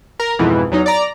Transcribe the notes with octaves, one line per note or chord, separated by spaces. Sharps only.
A#4
F2 G#2 B2 E3
E2 F#3 D#4
D5 A#5